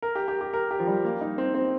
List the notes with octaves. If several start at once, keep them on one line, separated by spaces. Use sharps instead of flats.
A#4
G4
G4
G4
A#4
G4
F3
G3
A#3
D#4
C4
C4